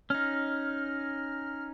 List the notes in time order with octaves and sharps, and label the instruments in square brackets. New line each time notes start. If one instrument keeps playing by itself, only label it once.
[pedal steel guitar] C#4 D#4 [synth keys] F6